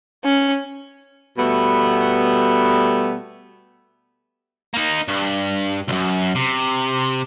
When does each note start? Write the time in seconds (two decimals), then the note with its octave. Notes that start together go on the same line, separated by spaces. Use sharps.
0.24 C#4
1.38 B2 G3 A3 B3
4.74 A#3 D#4
5.08 G2
5.88 C#2 F#2
6.35 C3